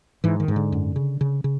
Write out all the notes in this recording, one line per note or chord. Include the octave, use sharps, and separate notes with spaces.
G#2 E3
D#3
G#2
D3
F#2
C#3
C#3
C#3